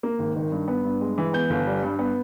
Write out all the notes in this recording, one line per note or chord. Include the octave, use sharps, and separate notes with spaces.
A#3
G#1
D#3
G2
B3
G2
G#3
E3
B3 G6
G1
G3
G2
B3